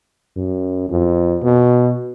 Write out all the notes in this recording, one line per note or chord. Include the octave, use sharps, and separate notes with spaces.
F#2
F2
B2